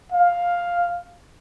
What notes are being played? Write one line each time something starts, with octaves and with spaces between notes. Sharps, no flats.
F5